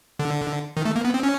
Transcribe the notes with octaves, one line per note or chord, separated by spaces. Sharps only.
D3
D#3
A3
A#3
B3
C4
C#4